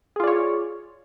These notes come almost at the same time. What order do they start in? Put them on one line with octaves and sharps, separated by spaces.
G#4 F4 D5 C#5